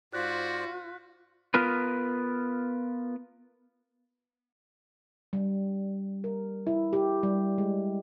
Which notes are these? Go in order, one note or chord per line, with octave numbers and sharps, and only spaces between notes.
G#2 F4 F#4 C5 D5 F#6 B6
B3 F4 A#4 B4
G3
A#4
E4
G4
G3
G#3